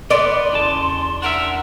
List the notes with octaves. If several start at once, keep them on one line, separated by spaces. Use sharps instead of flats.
B3 D5 C6
E2 C#3 A5
D4 A#4 E5 F#5